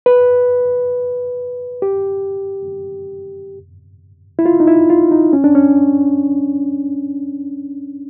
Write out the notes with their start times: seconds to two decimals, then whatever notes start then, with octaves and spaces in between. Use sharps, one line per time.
0.06 B4
1.82 G4
4.39 E4
4.46 F4
4.60 D#4
4.67 E4
4.90 F4
5.11 D#4
5.33 C#4
5.44 D4
5.55 C#4